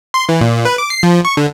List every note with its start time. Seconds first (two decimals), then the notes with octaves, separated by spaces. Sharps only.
0.14 C6
0.29 E3
0.41 A#2
0.65 B4
0.78 D6
0.90 C7
1.03 F3
1.25 C#6
1.37 D3